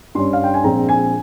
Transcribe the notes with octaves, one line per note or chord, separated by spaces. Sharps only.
G2 G3 C#4 C6
F5
G5
G#5
A#1 A#2 G#3 C4 A#5
G#5